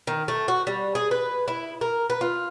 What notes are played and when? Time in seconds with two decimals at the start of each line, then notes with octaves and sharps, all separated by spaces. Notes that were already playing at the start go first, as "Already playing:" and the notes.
0.07 D#3
0.28 A3
0.48 F#4
0.67 G3
0.95 G#4
1.11 B4
1.48 E4
1.81 A#4
2.10 B4
2.21 F4